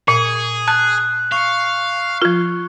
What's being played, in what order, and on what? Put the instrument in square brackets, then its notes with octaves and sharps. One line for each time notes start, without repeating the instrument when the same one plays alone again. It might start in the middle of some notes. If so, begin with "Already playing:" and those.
[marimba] A#2 [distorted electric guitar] G#4
[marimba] A5 [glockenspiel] F#6
[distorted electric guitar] F5 [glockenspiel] C#6 C#7
[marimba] F3 F4